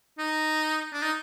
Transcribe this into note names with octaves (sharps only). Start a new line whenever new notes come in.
D#4
D4
D#4